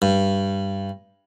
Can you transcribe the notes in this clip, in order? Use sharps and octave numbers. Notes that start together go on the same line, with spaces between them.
G2